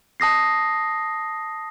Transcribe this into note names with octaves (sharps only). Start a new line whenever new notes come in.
A5 D#6 A#6 C7